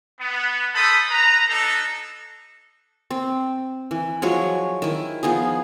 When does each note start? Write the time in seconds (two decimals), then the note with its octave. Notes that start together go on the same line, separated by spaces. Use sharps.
0.19 B3
0.74 G#3 A4 C5 A5 B5 D#6
1.11 B4 A#5
1.48 B3 D4 D#4 A4
3.11 C4
3.91 E3
4.22 F3 F#3 G#3 C#5
4.82 D#3 E4
5.23 F3 B3 D#4 G#4